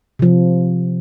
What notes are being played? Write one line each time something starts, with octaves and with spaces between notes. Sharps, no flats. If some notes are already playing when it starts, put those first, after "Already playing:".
C3 F3